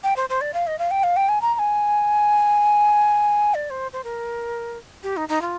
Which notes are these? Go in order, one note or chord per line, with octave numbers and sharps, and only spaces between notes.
G5
C5
C5
D5
F5
D#5
F5
G5
F5
G5
G#5
A#5
A#5
G#5
D5
C5
C5
A#4
G4
D#4
D#4
F4